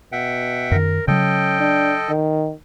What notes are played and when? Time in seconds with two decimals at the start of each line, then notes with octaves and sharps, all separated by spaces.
0.12 B2 E5 F#5 G5
0.71 F#2 D#3 A#4
1.08 C#3 F#3 C#4 A4 D#5 G5
1.60 D4
2.09 D#3